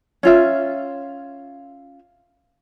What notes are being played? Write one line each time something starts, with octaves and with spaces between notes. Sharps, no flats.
C#4 F4 E5